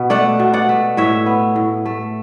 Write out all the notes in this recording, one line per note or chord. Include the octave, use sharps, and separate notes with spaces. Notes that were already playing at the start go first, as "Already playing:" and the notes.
Already playing: B2 B3
A3 D5 F#5
B2
D5 F#5
A3
A2 C#5 E5
B3
A2
A3